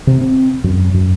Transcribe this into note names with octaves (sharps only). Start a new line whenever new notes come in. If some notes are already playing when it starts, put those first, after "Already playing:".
C3
C4
F#2
F#2